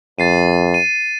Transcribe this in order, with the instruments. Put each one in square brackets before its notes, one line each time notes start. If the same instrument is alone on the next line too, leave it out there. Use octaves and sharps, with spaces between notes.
[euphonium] F2 [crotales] A6 C7 D#7
[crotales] D#7